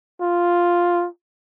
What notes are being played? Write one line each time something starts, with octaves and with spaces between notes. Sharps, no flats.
F4